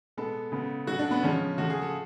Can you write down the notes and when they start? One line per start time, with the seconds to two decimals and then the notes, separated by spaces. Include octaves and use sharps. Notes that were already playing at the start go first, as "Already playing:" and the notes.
0.17 B2 G#3 B3 A4
0.52 C#3 G#3 B3
0.87 C#3 F#3 A3 F#4
0.99 D4
1.11 B3
1.23 C#3 F3 G#3 C#4
1.58 C#3 F3 A3 F#4
1.70 G#4
1.81 A4